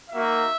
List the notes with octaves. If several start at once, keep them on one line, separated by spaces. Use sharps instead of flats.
A#3 D#4 F#4 E5